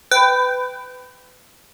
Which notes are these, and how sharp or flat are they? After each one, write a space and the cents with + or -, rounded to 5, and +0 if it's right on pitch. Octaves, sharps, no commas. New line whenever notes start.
B4 +25 G5 -10